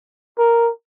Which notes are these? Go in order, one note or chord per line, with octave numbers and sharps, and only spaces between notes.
A#4